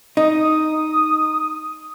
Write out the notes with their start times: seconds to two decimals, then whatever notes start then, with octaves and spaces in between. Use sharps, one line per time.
0.17 D#4 D#6